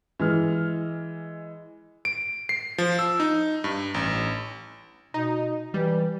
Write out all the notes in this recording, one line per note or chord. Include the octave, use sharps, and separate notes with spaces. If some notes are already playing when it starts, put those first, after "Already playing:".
E3 G#3 F6
D7
C7
F3
E6
D#4
G2
A1
B2 D#4
E3 G3